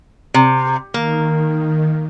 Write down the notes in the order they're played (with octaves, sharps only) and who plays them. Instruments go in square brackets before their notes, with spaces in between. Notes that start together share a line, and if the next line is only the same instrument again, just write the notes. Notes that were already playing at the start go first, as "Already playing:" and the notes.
[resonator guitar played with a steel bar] C3
[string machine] D#3 [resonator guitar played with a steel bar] A#3